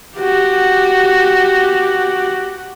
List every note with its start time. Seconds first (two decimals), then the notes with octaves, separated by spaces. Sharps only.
0.17 F#4 G4